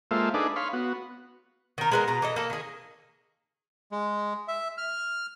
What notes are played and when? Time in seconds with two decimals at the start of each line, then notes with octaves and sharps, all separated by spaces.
0.11 G#3 A#3 F4 A4 C5 E5
0.34 D4 D#4 G#4 A4 B4 D5
0.56 C#5 F5 B5 C6
0.73 B3 F#4
1.78 D#3 A#4
1.92 G#3 B3 A#4
2.08 B2 A#5
2.22 E3 A4 D#5
2.36 A#3 A4
2.50 D#3 G#4
3.92 G#3
4.48 E5
4.78 F6